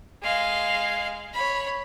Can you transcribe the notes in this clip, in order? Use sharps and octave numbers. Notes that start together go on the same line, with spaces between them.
G#3 F5
C#5 B5